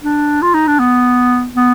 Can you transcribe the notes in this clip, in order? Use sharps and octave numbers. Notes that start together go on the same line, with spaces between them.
D4
F4
D#4
D4
B3
B3